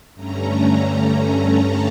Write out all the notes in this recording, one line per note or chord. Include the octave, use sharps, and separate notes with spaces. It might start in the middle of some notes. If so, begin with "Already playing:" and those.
G2 D3 A3 C#4 A#5
A5